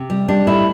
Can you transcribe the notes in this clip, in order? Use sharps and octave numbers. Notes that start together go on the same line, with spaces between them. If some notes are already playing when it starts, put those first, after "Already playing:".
Already playing: C3
G3
G3 D4
A2 E4